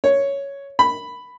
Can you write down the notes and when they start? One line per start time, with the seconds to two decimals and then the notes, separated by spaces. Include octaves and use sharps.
0.04 C#5
0.79 B5